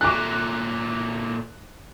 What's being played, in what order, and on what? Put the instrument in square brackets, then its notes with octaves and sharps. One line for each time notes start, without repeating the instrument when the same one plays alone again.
[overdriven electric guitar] A#2 A3 [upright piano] D6 F#6